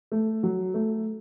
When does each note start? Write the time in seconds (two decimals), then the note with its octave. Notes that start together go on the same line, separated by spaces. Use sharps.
0.12 A3
0.43 F#3
0.74 A3